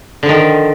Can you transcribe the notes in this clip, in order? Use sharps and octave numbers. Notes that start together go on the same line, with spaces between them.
D3 D#3 F3